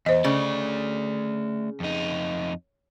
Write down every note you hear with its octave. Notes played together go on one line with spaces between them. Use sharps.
E2 C5 D#5
C#3 A3 D5
F2 D#4